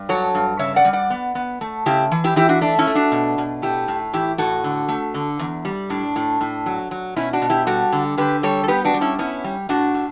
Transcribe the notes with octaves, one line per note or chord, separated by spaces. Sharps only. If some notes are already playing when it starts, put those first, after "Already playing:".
Already playing: G2
F#3 A4 C#5
G2
C#3 C#5 E5
D5 F#5
G3
D5 F#5
B3
B3
A3
C#3 E4 G4
E3
E4 G4
E3 E4 G4
D4 F#4
A3 D4
C#4 E4
A3
D4 F#4
B2
B2
A3 E4 G4
A2
E3 E4 G4
A2 F#4 A4
D3
A3
D3
E2
G3
A2 D4
A2
A2
F#3
F#3
B2 C#4 E4
D4 F#4
B2
E4 G4
G3 F#4 A4
D3
D3 G4 B4
G3 A4 C#5
A4
B3 G4 B4
D4 F#4
G3
C#4 E4
B3 C#4 E4
G3
A2 D4 F#4
A2